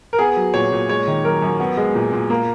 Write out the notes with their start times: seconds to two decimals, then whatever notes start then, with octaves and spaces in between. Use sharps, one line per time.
0.13 A#4
0.19 B3 G#4
0.36 F#3
0.54 A#2 C#5
0.72 A#2
0.89 G#3 C#5
1.08 D#3
1.24 F#2 A#4
1.42 F#2
1.60 B3
1.77 G#3
1.95 A#2
2.13 A#2
2.30 A#3